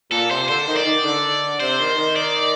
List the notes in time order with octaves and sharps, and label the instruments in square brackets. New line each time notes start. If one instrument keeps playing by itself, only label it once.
[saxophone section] A#2 [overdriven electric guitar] A4
[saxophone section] C3 [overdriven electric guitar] C5
[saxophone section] D3 [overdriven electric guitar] C5
[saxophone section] D#3
[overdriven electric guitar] D5
[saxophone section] D#3
D3
[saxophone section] C3 [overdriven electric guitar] C5
[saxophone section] D#3
D#3
[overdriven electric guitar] D5